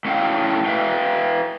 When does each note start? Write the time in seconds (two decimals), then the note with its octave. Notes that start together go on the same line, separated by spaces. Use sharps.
0.05 A2 C#4 C#5 F5 G5
0.66 B4 E5 F5 G5